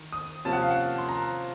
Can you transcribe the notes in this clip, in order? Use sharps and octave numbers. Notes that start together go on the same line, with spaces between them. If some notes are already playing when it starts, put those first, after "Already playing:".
Already playing: D#3
D#6
C3 F3 A#3 C#4 A5
F#5
F5
F#5
C6
A#5